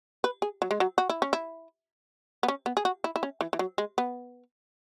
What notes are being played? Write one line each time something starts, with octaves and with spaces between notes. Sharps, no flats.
B4
G#4
F#3
G#3
F#3
F#4
E4
C#4
E4
B3
C#4
B3
G#4
F#4
E4
E4
C#4
E3
E3
F#3
G#3
B3